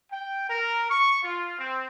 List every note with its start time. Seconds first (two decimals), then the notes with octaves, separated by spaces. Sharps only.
0.12 G5
0.48 A#4
0.90 C#6
1.23 F4
1.58 C4